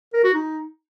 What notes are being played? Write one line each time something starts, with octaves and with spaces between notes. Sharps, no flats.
A#4
F#4
D#4